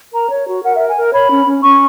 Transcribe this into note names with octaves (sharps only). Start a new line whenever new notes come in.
A#4 A#5
C#5
F#4
A#4 F#5
E5
A#4
G#5
A#4
C#5 B5
C#4
C#4
C#4 C#6